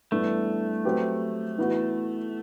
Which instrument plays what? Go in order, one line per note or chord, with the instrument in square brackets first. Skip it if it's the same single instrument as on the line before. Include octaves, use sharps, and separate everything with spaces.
[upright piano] G2 E3 B3 D4 [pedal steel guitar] A3
[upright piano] F#3 C4 G4 B4
E3 B3 F#4